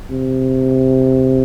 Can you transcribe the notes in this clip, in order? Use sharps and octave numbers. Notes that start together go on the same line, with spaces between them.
C3